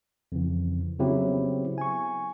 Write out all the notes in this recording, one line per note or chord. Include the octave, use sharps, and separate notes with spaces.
F2 C#3 E3
C#3 F#3 B3 C4 E4 G4
G#5 C#6